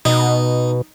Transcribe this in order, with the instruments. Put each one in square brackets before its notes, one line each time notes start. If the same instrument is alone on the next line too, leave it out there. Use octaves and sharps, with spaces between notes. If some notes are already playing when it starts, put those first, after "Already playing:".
[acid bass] B2 [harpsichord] D#4